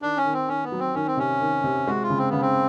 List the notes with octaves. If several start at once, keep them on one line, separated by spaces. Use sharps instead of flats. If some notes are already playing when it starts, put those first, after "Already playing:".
D#3 D4
C#4
D#3
C4
D#3 C#4
B3
F#3
C4
D#3 C#4
C4
C3 C#4
D#3
C3
G#3 F#4
F4
C#3
C4
C#3 B3
C4